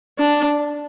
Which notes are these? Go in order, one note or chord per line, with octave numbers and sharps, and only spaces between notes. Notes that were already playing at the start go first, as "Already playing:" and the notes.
D4